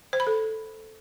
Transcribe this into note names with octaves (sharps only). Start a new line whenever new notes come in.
C5
B5
A4